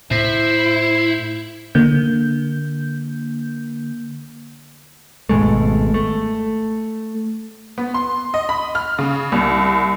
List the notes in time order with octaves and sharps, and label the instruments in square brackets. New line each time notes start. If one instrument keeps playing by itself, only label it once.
[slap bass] A2 [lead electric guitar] E4 [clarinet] C5
[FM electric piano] D3 A#3 G6
[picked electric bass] G#1 B2 G#3 A3
A3
[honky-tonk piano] B3
C6
D#5
B5
F6
C#3
C2